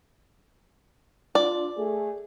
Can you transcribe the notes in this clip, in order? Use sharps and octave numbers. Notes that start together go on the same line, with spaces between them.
D4 F4 D5
A3 G#4